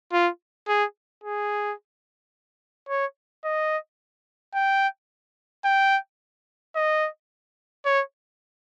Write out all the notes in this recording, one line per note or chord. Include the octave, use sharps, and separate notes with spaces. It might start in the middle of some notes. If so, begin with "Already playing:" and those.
F4
G#4
G#4
C#5
D#5
G5
G5
D#5
C#5